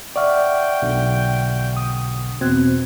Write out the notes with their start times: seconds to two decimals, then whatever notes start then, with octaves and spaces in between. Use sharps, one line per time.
0.16 D5 E5 F#5 G5 C#6 F6
0.82 B1 B2 D3
1.77 D#6
2.41 E2 B2 C4 F#6 G#6